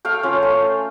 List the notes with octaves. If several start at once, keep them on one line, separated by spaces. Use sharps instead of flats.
A3 F5 G5
C#4 F4
A3